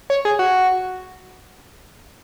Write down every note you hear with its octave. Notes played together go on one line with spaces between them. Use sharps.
C#5
G#4
F#4